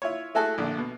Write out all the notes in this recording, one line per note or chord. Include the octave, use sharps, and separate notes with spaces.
E4 F4 C#5
A3 E4 F#4 G#4 A4
A#1 D3
B2